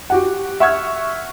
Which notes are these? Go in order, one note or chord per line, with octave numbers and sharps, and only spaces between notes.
F#4 G4 F#5
E5 F#5 C#6 E6 F6 G#6